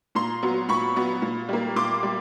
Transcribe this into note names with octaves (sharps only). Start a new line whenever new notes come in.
A#2 A#5 C6
F#3 B3
A#2 B5 C#6
F#3 B3
A#2
G3 A#3
A#2 C6 D6
G3